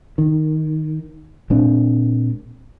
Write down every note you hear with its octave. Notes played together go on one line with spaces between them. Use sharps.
D#3
A#2 G#3 C4 D4